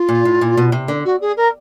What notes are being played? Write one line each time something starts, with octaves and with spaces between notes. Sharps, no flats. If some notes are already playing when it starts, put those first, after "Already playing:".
Already playing: F4
A#2
A2
A#2
B2
C3
D3
F#4
G#4
A#4